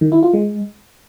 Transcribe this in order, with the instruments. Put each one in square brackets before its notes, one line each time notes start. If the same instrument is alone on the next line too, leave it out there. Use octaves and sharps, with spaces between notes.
[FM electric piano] D#3
E4
F4
G#3